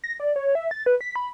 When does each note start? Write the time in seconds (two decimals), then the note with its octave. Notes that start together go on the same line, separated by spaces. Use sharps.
0.04 A#6
0.20 D5
0.36 C#5
0.55 E5
0.71 A6
0.86 B4
1.01 B6
1.16 B5